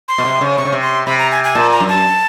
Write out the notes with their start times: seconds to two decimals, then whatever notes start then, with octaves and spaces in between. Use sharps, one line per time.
0.08 C6
0.18 B2
0.25 C3
0.41 C#3
0.57 C3 C#6
0.65 C#3
0.72 C3
0.82 C6
1.06 C3 B5
1.19 A#5
1.32 G#5
1.44 G#5
1.55 A#2 A5
1.72 A#5
1.80 F#2
1.89 A5